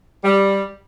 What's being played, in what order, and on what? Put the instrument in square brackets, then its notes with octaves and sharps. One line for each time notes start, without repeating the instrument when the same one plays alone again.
[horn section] G3